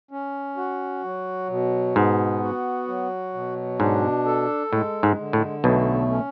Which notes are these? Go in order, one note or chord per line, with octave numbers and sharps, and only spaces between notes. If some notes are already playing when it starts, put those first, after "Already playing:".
C#4
F#4
F#3
B2
G#2 B3
F#4
F#3
B2
G#2 D4
A4
A2 G#3
G#2
D3
A2
B1 B2 A3
C#4